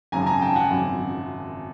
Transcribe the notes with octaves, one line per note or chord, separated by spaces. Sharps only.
G#1 F#2 C#3 G#5 A#5
A5
G#5 A#5
G5 A5
F#5 G#5
G#1 F#2 C#3